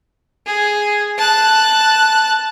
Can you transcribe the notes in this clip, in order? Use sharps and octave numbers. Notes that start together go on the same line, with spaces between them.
G#4
A5 F#6